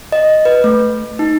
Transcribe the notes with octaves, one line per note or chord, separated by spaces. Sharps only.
D#5
B4
A3
D#4